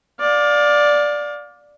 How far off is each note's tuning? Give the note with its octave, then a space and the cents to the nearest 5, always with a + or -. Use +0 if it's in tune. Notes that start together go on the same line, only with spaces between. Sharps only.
D5 +0 F5 +30